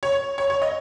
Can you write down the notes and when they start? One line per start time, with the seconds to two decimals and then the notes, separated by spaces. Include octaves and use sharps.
0.03 C#5
0.38 C#5
0.50 C#5
0.62 D#5